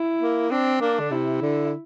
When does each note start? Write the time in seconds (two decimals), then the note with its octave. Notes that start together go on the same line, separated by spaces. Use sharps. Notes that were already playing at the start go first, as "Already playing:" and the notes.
Already playing: E4
0.21 A#3
0.51 C4 D4
0.81 A#3 D4
1.00 D3
1.11 C3 E4
1.42 D3